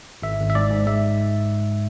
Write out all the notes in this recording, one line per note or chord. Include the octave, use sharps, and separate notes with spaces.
G#1 E5
G#1
E5
G#2 D5
G#2
G#3 E5